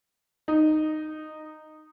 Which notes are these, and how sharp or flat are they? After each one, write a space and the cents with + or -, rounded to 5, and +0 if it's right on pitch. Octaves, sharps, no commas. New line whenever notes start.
D#4 -10